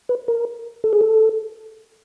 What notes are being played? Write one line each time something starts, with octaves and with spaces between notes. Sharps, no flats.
B4
A#4
A4
G#4
A4